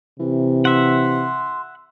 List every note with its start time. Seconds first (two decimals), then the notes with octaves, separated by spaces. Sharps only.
0.19 C3 E3
0.65 E5 F#5 C6